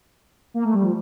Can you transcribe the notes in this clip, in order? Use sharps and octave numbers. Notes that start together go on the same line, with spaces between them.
A#3
A3
G3
F3